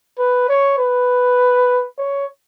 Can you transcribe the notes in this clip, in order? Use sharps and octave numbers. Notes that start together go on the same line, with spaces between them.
B4
C#5
B4
C#5